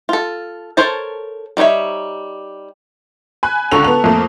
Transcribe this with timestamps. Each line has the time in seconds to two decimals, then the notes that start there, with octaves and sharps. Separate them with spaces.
0.09 F4 A4
0.77 A4 A#4 C5 C#5 A5
1.57 G3 D#4 C5 C#5 E5
3.43 G#5 B5 F#6
3.72 C#2 D3 A4 A#5 C#6 F7
3.84 B3 F7
4.04 F2 A3 A#3